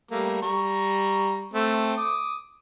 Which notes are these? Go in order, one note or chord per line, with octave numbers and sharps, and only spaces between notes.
G3 A3 A#3
G3 A#5 C#6
A3 C4
D6 D#6